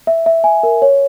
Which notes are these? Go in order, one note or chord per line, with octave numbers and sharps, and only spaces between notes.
E5
E5
G#5
A#4
C#5